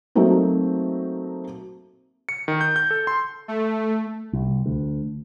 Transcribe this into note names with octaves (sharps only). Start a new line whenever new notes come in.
F#3 A3 A#3 C4 D#4
C#7
D#3
G6
G6
A4
C6
A3
C2
D2